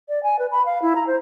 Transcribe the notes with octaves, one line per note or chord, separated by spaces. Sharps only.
D5
G#5
B4
B5
F5
E4
A#5
C5